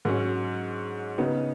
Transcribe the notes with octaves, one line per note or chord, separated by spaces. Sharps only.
G#2 F#3 C#4
C#3 B3 D#4